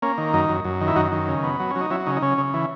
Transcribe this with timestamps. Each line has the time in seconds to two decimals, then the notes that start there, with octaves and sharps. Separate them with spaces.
0.02 A#3 C#4
0.18 D#3
0.33 F#2 D#4
0.49 F#2
0.65 F#2
0.81 D#3
0.87 E4
0.96 F#2 D#4 F#4
1.12 D#3
1.28 C#3
1.44 B3
1.59 F#3
1.71 F#3 C#4
1.81 D#4
1.90 F#3 C#4 E4
2.06 C#3 D#4
2.17 D#4
2.22 C#3 C#4
2.38 C#3
2.53 E3